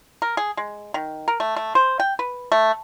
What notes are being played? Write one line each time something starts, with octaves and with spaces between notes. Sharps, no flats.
A#4
G#4
G#3
D#3
A#4
A3
A3
C5
G5
B4
A3